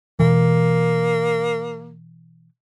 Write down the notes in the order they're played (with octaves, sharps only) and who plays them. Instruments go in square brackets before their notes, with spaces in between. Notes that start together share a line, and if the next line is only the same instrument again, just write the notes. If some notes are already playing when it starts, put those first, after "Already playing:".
[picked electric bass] B2 E3 [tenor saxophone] A#3